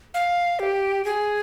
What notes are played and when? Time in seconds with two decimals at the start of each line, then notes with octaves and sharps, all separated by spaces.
0.14 F5
0.59 G4
1.05 G#4